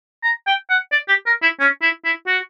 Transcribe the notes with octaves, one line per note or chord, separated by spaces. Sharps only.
A#5
G5
F#5
D5
G4
A#4
E4
C#4
E4
E4
F#4